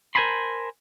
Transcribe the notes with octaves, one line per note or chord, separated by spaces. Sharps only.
A#4 C5 G#5 A5 B5 C6